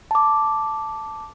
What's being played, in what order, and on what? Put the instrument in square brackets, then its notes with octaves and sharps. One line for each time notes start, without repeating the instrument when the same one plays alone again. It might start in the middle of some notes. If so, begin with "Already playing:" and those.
[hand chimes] A5 D6